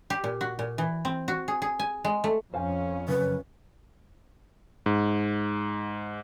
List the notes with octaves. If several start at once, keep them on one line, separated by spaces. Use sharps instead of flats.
G4
A#2
F#4
A#2
E3
C4
F#4
G#4
G#4
G#5
G#3
A3
F2 C#4 C5 F5 G#5
F#2 C#3 B4
G#2